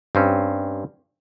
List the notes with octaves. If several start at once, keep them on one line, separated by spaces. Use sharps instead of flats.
G2 C4 C#4